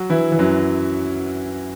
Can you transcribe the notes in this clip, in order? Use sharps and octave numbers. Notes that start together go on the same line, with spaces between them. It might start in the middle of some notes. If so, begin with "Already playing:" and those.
Already playing: F#3 F#4
E3 E4
E3
F#2 F#3